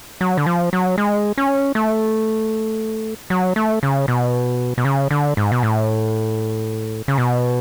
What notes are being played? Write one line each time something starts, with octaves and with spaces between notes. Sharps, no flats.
F#3
D3
F3
F#3
G#3
C#4
A3
F#3
A3
C#3
B2
B2
C#3
D3
G#2
B2
A2
C#3
B2